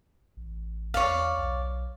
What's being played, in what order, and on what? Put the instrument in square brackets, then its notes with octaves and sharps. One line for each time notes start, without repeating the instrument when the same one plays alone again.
[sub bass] A1
[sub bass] E2 [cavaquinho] C#5 D5 F5
[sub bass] B1